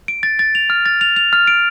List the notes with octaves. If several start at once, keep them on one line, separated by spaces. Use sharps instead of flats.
D7
A6
A6
F7
F6
A6
F7
F7
F6
D7